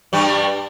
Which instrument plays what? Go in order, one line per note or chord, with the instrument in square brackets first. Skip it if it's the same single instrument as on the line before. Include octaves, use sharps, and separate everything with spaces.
[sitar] G2 G3